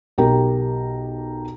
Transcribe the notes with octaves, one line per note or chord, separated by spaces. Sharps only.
B1 G4 A#4 G5 A#5